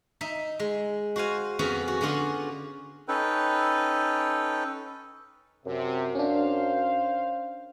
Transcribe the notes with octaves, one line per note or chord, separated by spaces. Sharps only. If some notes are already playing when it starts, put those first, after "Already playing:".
D#4 E5
G#3
F#4 C5 F5 G#5
F2 B3 C#4 F#4 G#4
F#4
D3 C#4 F4 F#4 G#4
C#4 D#4 A4 B4 G5
F#2 C3
C#4 D4 C5 F5